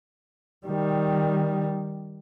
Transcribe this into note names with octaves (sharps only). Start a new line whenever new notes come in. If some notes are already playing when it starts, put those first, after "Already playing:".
D#3 G3